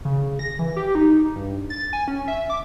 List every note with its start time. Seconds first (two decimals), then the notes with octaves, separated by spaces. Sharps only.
0.05 C#3
0.39 A#6
0.59 E3
0.77 G4
0.95 D#4
1.36 G2
1.70 A6
1.93 G#5
2.08 C#4
2.28 E5
2.50 D6